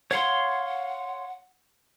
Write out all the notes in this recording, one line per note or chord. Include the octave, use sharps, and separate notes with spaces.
C#5 F5 F#5 C6